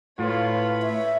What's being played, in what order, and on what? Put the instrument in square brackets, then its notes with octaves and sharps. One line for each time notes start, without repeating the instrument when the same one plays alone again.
[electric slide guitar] A2 [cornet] F4 [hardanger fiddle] B4 C#5
[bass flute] E5